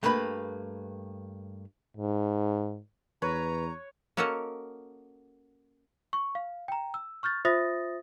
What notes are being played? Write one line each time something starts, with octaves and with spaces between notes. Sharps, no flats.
G2 A3 A#3 B4 B5
G#2
E2 B4 C#5 A#5
A#3 C#4 F#4 A4 A#4 D#5
C#6
F5
G5 A#5
E6
C#6 F6 G6 A6
F4 C5 E5 D#6 A6 A#6